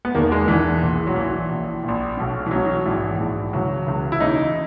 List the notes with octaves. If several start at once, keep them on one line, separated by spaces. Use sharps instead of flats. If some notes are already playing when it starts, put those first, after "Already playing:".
B3
E1 E2 D#3 A#3
G#3
E1 E2 D#3 E3
A#1 A#2
F#3
A#1 A#2 E3
A#1 A#2
A#1 A#2
B1 B2
E3
B1 B2 F#3
A#1 G#2 E3
A#1 G#2 E3
C#2 C#3 E3 F#3
C#2 C#3 E3
E4
D#2 C#3 E3 D#4